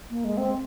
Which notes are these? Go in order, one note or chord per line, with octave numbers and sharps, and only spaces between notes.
A#3
G#3
C4